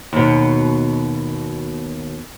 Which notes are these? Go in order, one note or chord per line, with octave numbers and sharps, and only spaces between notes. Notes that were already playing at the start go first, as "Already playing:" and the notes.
D#2 B2